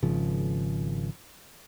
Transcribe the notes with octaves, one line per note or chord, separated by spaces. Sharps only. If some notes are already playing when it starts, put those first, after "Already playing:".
G#1 C#3 F3